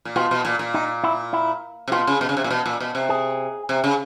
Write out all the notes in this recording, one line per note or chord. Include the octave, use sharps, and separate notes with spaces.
A#2
B2 F4
B2
A#2
A#2
D#4
E4
E4
C3
B2 F4
C#3
B2
C#3
C3
A#2
B2
A#2
B2
C3
G#4
C3
C#3